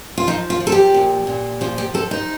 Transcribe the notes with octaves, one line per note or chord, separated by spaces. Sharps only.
F4
F3 D#4
F4
F3
A4
G4
A#2
A#2
F3 F4
G4
F3 A4
D#4